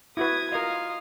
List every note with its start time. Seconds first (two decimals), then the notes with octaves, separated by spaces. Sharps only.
0.17 E4 F#4 B4 D#6 G#6
0.52 F4 A#4 D#5 F5 D#6